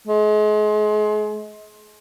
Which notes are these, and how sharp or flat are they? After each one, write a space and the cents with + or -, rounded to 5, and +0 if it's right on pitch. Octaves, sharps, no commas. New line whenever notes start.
G#3 +35